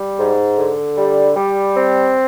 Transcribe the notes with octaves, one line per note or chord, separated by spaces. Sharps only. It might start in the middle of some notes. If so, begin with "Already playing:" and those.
Already playing: G3
G#2
D3
G3
G3
C4